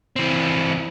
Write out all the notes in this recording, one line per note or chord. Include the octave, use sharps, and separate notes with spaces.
E3 C4